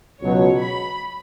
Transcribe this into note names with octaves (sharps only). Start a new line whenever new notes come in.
C#2 B2 F#3 C#5
B5